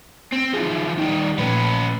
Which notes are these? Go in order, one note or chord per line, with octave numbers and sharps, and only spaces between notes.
C4
E3 F3 D#4 G#4
D#3 G3 D#4
A#2 F3 A3 C#4 B4